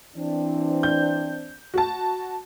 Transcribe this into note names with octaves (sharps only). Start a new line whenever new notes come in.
E3 C4 D4
G6
F#4 A5